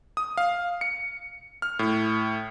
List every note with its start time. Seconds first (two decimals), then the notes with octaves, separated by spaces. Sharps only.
0.17 D#6
0.37 F5
0.81 C#7
1.62 F6
1.79 A2